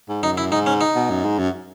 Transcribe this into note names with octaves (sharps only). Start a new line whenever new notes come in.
G#2
F#2 D#4
E4
G#2 D#4
C#4
D#4
B2
F#2
G#2
F#2